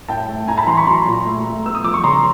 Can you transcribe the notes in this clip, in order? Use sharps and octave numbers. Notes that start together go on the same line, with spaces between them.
A2 G5 A5
A3
A2 G#5 A#5
A5 B5
E3 A#5 C6
B5 C#6
F#3 A#5 C6
A#2
A3
A3
B3 E6
D#6
F3 D6
C#6
C#3 A#5 C6